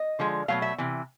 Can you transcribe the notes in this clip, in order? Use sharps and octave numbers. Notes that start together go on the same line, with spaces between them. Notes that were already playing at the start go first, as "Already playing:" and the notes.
Already playing: D#5
D3 F3 G#3
B2 F#3 A3 F5
E5
C3 E3